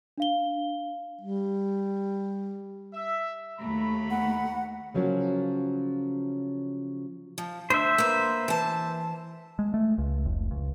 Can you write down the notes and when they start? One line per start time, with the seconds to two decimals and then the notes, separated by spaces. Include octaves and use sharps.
0.18 D4 F5 G7
1.21 G3
2.94 E5
3.59 D#2 F#3 A3 A#5 B5
4.10 F#5
4.94 C#3 F3 F#3 A#3 C#4
7.38 F3
7.70 D2 C5 E5
7.98 A#3 B4
8.48 E3 A5
9.59 G#3
9.74 A3
9.98 C#2
10.26 F1
10.51 C#2